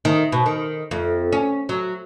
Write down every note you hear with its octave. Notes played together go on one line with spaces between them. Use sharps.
D#3
B2
D#3
F2
C#4
F#3